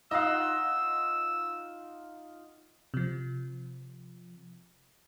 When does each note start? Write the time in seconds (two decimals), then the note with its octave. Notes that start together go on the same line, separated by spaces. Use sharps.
0.11 D#4 F4 D#5 F5 F#5 E6
2.94 C3 F3